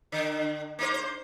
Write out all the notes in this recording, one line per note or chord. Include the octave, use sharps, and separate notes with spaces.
D3
A#3 D#4 C5
C5